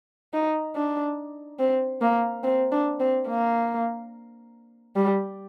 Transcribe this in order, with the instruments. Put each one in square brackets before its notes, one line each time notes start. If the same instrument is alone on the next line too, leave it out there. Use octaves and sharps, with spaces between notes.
[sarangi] D#4
D4
C4
A#3
C4
D4
C4
A#3
G3